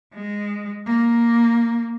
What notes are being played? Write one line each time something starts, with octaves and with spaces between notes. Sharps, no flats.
G#3
A#3